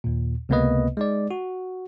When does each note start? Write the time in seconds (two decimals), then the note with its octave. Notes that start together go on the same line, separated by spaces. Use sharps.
0.04 D#2 A#2
0.49 C#2 C3 A#3 B3 B4 D#5
0.97 G#3 D#4 D5
1.31 F#4